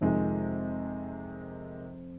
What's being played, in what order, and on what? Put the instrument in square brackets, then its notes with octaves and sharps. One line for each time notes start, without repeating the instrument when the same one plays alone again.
[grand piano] F2 F3 [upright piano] C3 D#3 G#3